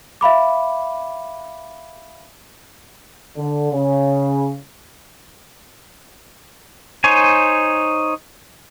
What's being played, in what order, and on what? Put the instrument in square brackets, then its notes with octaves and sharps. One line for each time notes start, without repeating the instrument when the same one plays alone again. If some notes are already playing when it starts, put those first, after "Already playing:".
[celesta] E5 F5 B5 D6
[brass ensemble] D3
C#3
[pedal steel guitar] D#4 C5 C#5 G#5